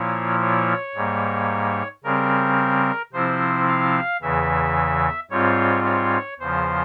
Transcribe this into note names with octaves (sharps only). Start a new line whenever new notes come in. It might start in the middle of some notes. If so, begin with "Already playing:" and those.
Already playing: A#2 F3 A#3 E4 C#5
C#5
G#2 G3 A#3
C#3 G3 C4 A#4
C3 F3 C4 E4 C5
F5
E2 C#3 E3 E5
G#2 G3 C4 F4 C#5
C#5
E2 C#3 F3 C5